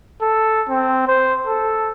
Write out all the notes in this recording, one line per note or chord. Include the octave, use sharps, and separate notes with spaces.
A4
C4
C5
A4